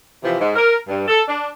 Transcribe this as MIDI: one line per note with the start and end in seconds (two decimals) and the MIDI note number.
0.23 0.37 48
0.23 0.37 52
0.23 0.37 53
0.40 0.53 44
0.55 0.75 70
0.87 1.05 43
1.07 1.22 69
1.27 1.46 62